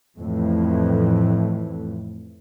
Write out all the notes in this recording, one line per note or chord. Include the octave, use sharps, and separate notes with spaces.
F2 A2 E3 A3